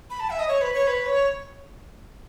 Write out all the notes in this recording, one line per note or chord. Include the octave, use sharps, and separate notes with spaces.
B5
A5
E5
D#5
C#5
B4
C#5
B4
C#5